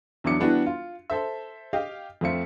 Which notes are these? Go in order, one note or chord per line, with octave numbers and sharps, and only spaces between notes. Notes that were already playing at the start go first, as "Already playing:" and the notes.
E2 F#3 D4 E5 D6 C#7
E3 G3 B3 D4 E4 F#4
F4
A4 C5 E5
G4 D#5 F5
F2 A3 C4 F4 E5 C#7